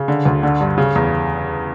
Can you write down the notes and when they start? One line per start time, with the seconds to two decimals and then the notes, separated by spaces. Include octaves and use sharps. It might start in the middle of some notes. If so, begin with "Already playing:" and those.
Already playing: C#3
0.08 D3
0.25 D2
0.43 D3
0.61 G2
0.78 C#3
0.95 E2